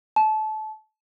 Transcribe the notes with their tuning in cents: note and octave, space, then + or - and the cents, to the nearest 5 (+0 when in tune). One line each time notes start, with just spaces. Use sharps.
A5 -25